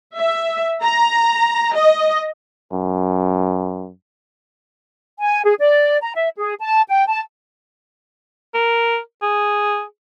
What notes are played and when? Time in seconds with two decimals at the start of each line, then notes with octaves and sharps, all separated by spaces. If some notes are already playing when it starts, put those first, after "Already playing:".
0.18 E5
0.83 A#5
1.76 D#5
2.73 F#2
5.18 G#5
5.44 G#4
5.59 D5
6.02 A#5
6.15 E5
6.37 G#4
6.60 A5
6.89 G5
7.08 A5
8.54 A#4
9.22 G#4